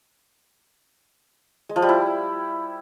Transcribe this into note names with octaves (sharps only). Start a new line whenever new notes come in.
G#3
F3
G3
E4